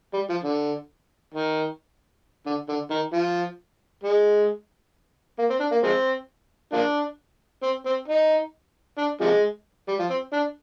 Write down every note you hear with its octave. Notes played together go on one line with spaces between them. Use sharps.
G3
F3
D3
D#3
D3
D3
D#3
F3
G#3
A#3
C4
D4
A#3
F3 G#3 C4
F3 A#3 D4
C4
C4
D#4
D4
C3 F3 G#3
G3
F3
C4
D4